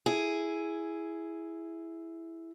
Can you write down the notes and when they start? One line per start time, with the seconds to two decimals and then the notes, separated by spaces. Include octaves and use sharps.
0.06 E4 G#4